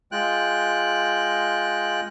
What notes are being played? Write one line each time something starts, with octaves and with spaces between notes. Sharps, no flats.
G#3 F4 G5 F#6